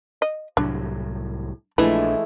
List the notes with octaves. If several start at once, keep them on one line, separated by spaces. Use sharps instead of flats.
D#5
C2 A2 F#3 D4
A#1 E3 F3 G#3 A3 D4 B4